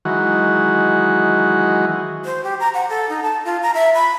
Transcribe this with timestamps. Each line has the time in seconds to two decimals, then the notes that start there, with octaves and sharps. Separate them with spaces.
0.05 D#3 E3 F#3 G#3 F#4
2.25 C5
2.44 G4
2.60 A#5
2.74 F#5
2.89 A4
3.09 D#4
3.23 A5
3.45 F4
3.63 A#5
3.74 E5
3.95 B5